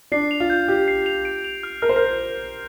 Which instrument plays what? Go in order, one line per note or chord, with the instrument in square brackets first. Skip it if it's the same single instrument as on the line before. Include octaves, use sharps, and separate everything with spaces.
[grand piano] D4 [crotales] C7
[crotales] F7
[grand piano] F4
[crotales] G6
[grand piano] G4 [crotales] G6
[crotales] C7
F7
D7
F7
F6
[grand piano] A#4 [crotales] F6
[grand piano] C5
A#4